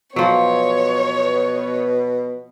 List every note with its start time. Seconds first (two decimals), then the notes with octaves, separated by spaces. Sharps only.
0.16 B2 F3 F#3 B3 C#5